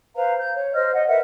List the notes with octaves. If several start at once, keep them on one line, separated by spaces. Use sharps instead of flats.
B4 C5 F5 A#5
G6
C#5
C5 D#5 F6
D#5 F#5
A#4 B4 E5 F#5